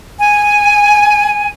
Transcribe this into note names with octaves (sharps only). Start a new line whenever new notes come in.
G#5